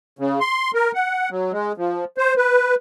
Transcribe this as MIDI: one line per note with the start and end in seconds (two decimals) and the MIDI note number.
0.19 0.40 49
0.40 0.71 84
0.74 0.92 70
0.94 1.29 78
1.30 1.52 54
1.52 1.72 56
1.77 2.05 53
2.18 2.34 72
2.37 2.75 71